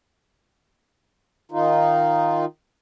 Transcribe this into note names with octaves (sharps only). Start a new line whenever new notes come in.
D#3 D#4 F4